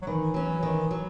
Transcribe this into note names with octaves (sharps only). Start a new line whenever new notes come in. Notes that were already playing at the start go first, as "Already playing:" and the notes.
F#3
D#3 E3
F#3 C#4
D#3
F#3